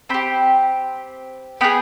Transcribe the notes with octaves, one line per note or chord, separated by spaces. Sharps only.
C4 G4 G5 B5
B3 F4 G#4 G5 B5